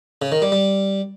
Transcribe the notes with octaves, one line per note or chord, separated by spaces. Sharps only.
C#3
D#3
G3
G3